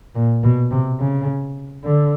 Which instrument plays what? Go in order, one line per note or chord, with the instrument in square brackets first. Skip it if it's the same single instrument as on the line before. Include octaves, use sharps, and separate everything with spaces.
[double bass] A#2
B2
C3
C#3
D3